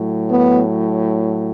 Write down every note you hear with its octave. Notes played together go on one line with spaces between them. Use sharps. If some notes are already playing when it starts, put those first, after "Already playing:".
Already playing: A2 F#3
B3